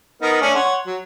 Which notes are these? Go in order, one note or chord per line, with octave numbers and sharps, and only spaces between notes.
B3 D#4 A#4
A3 C#4 D4
C#5 F#5 C6
F#3